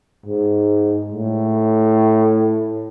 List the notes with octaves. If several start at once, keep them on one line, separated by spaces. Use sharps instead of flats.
G#2
A2